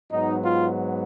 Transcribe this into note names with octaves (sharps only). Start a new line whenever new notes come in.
G#2 F#3 B3 D#4
F4